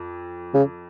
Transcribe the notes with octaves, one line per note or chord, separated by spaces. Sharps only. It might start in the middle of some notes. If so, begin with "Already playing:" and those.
Already playing: F2
C#3